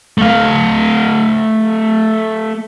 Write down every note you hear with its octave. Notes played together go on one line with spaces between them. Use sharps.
A3 F5